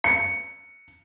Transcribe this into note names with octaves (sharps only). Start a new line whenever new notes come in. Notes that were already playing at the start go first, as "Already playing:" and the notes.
C#7